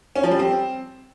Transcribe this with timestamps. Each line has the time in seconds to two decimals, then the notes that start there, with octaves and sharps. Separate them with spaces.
0.16 C#4
0.23 F3
0.31 G3
0.39 C4